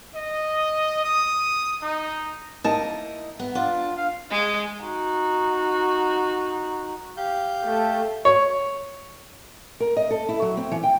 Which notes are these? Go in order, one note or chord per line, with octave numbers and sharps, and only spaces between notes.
D#5
D#6
D#4
A#3 D#4 E4 D#5 A5
B3
D4 F4
F5
G#3
D#4 F#4
G4 F5 G6
A3
C#5
A#4
D#5
A4
E4
F#3
C4
E3
G5